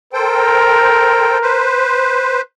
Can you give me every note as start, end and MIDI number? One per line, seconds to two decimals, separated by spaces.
0.13 1.38 69
0.13 1.67 70
0.13 1.38 72
0.13 1.38 79
1.42 2.41 71
1.42 2.41 72